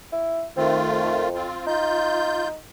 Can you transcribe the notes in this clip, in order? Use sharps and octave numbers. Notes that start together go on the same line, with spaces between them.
E4
D#3 A3 C4 F4
F2
C4 F4
D#4 F4 G6